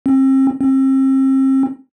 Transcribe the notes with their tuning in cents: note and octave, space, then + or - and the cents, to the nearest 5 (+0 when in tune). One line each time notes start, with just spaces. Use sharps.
C4 +35
C4 +35